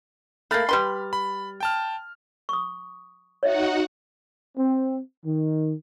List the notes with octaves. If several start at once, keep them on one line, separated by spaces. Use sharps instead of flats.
A3 A#3 B5 F6 A6
G3 B4 C6
B5
G5 A5 F6
C#6 D#6
D#4 F#4 C#5 D#5 E5 F#5
C4
D#3